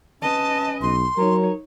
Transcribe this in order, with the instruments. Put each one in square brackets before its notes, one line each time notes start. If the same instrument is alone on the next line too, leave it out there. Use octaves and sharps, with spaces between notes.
[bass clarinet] C#4 [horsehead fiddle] B4 D#5 [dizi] A5
[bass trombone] B1 [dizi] C6
[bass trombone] F#3 [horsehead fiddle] D#4 C#5 [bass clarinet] A#4